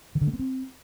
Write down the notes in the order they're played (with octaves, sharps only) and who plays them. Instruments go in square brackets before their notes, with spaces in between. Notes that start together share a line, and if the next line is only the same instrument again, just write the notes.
[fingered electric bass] D#3
D3
A3
B3
C4